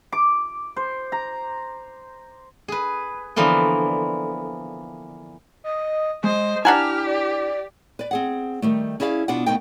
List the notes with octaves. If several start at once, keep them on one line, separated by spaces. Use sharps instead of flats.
D6
C5
A#5
G#4 B4
D3 E3 F3 A#3 B3
D#5
G#3 C5 D#5
D4 E4 G4 F#5 G#5 A#5 F6
D5
B4 D5
C4 G#4 F#5
D#3 G3 A3
C#4 E4 G#4 D5 F5
B2 B3 D4 F4 B4 F#5
D2 B2 B3 D#4 A#4 G5